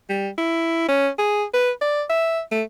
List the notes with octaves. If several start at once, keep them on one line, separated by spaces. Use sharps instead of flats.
G3
E4
C#4
G#4
B4
D5
E5
A3